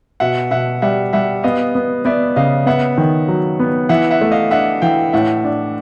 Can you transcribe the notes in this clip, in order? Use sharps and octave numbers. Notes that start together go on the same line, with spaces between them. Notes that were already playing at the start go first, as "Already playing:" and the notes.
B2 E5 F#5
B2 E5 F#5
G3 E5 F#5
G3 E5 F#5
B3 D#5 F5
B3
B3 D5 E5
C#3 D#5 F5
B3 E5 F#5
D#3
F#3
B3
E3 E5 F#5
E5 F#5
A3
D#5 F5
D4 E5 F#5
E3 F5 G5
A2 E5 F#5
D4